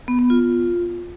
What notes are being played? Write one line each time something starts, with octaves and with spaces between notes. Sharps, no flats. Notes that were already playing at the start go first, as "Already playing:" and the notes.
B3
B3
F4